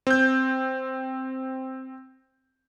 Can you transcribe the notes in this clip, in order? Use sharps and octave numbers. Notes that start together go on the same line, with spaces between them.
C4 G6